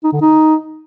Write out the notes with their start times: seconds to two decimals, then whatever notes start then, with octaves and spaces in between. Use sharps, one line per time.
0.04 D#4
0.13 D3
0.21 D#4